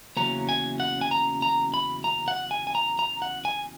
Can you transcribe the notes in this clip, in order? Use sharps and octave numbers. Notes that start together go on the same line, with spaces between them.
E2 C#3 F#3 A#3 C#4 A#5
G#5
F#5
G#5
A#5
A#5
B5
A#5
F#5
G#5
G#5
A#5
A#5
F#5
G#5